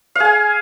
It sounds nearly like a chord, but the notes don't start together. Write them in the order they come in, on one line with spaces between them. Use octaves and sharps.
F5 G#4 G#5